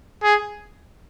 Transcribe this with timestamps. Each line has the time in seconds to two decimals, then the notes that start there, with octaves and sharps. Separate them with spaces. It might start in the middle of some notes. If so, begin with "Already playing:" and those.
0.24 G#4